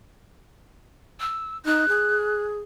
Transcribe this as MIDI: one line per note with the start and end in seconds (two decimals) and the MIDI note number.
1.20 1.57 88
1.65 1.88 63
1.65 2.45 90
1.89 2.58 68